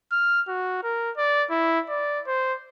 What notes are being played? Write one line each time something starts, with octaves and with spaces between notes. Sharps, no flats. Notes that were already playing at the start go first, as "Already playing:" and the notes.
F6
F#4
A#4
D5
E4
D5
C5